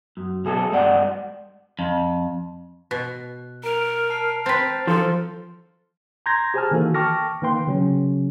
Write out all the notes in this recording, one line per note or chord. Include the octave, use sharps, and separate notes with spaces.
F#2
B1 G#4 A4
G2 G#3 D5 F#5 G5
F2
B2 F#6
A#4 A#5 D7 F7
A5 F6 C7
C4 B4 C5 F6 A6
F3 A4 C5
A#5 C6 G6 G#6 A#6
G4 G#4 C5 G#5 A5 F6
D#3 E3 A#3 F#4 A4
G5 A5 C#6 D6 F6 A#6
D#3 A#3 B4 G5 C6
C#3 F#3 C#4